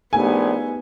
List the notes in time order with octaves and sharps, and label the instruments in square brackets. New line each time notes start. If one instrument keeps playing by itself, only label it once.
[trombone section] A#1 [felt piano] A3 D#4 G4 [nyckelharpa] B3 [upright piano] G#5